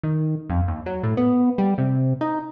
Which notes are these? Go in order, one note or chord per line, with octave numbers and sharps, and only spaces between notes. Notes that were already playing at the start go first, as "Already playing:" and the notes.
D#3
F2
D#2
F#3
A2
B3
G3
C3
D#4